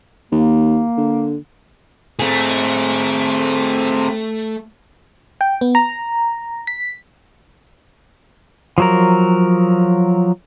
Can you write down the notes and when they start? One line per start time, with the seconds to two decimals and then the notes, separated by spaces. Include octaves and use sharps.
0.32 D#2 A#3
0.97 D3
2.20 A3 C4 G#4
5.41 G5
5.61 B3
5.75 A#5
6.67 B6
8.78 F3 F#3 A#4